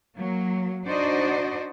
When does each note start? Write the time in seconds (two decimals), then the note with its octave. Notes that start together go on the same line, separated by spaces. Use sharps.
0.16 F#3 A#3
0.85 D4 D#4 F#4 C5 D5 D#5